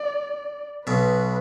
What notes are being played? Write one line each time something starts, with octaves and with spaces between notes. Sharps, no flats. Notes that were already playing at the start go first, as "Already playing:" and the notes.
Already playing: D5
B1 B2 B4